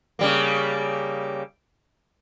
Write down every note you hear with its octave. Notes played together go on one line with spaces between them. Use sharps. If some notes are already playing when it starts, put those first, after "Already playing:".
C#3 G3 A#3